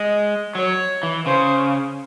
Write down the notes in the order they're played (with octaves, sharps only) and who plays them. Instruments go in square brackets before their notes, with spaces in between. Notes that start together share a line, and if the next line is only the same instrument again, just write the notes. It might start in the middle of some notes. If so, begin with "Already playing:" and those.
Already playing: [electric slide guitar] G#3 [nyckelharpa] D#5
[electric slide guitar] F#3 [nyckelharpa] C#5
[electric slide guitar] E3
[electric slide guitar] C#3 [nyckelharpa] C5